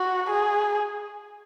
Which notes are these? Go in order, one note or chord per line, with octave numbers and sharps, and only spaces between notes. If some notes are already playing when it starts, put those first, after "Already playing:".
Already playing: F#4
G#4